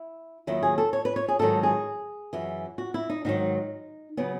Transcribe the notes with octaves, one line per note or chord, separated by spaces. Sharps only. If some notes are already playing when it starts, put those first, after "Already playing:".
Already playing: E4
D#2 D#3 F#3 E4
G#4
A4
C#5
B4
C#5
G#4
G#2 D#3 F#3 A4
G#4
F#2 E3
F#4
E4
D#4
G#2 D#3 F#3 D#4
C#3 F#3 B3